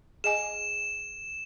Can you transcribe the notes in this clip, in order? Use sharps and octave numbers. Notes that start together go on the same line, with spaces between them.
G#4 D#5 G#5 E7